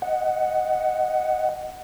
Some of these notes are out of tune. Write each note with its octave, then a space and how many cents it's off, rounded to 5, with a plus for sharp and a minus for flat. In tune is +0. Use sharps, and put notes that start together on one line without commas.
D#5 +0 F#5 +5